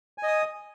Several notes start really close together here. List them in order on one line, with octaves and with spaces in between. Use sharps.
G#5 D#5 D#6